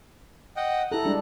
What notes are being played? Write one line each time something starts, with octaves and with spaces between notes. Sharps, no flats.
D#5 F#5 G5
E4 G4 A4 A#5 F#6
G3 G#3 D4